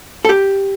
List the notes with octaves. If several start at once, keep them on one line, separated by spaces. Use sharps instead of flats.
A4
G4